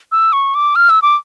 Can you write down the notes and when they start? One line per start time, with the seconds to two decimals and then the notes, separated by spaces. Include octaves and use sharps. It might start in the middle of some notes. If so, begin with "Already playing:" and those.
0.12 E6
0.33 C#6
0.55 D6
0.76 F6
0.90 E6
1.02 D6